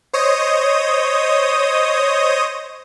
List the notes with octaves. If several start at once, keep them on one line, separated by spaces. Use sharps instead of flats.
C5 C#5 D#5 D#6